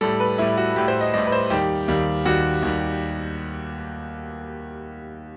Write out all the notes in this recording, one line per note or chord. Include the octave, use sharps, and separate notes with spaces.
A2 G3 A4
B4
A2 G3 E4
F#4
A2 G3 G4
C5
D#5
A2 G3 D#5
B4
C5
D#2 D#3 G3 G4
D#2 D#3 G3
D#2 D#3 G3 F#4
D#2 D#3 G3